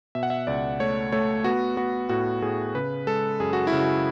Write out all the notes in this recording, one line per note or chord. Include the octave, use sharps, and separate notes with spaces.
B2 E5
F#5
E5
C#2 D5
A3 C#5
A3 C#5
B3 F#4
B3 F#4
A2 F#4
A2 G#4
C#3 B4
G#3 A4
F#2 G#4
F#4
E4
C#3
F#4